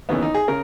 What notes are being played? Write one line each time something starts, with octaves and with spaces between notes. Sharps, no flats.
D#2 C#3 E3 B3
D#4
G#4
C#3 A#4